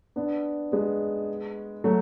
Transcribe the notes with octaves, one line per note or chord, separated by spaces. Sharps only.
B3 D4
G#3 B3
F#3 A3